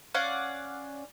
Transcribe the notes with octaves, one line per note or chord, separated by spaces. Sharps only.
C#4 D5 F5 F#5